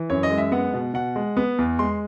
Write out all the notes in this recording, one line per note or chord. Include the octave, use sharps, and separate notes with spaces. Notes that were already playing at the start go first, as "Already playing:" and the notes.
Already playing: E3
F#2 C#5
D#5
G#3
E5
B3 F#5
B2
B2 F#5
G#3
B3
E2
G#3 C6